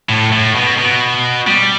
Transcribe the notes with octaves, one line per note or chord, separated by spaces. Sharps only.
A2
A2
B2
B2
G3